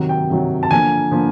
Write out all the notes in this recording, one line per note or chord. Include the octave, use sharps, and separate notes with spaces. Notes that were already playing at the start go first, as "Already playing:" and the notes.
Already playing: C3 D#3 F#3
G5
C3 D#3 F#3
A5
D3 F3 A#3 G#5
D3 F3 A#3